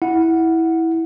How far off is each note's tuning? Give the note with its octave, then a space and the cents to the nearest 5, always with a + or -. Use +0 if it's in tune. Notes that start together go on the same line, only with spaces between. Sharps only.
E4 -10 F#5 -5